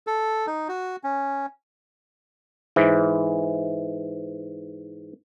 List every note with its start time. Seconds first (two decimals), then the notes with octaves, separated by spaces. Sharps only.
0.07 A4
0.47 D#4
0.69 F#4
1.04 C#4
2.76 G#2 E3